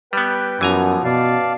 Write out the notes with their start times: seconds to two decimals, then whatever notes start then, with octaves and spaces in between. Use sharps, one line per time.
0.13 G3 B3 B4 G5
0.61 F#2 E3 F3 B3 G#5 A#5
1.04 B2 D5 F5 A5